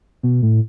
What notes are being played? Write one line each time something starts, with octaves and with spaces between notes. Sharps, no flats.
B2
A2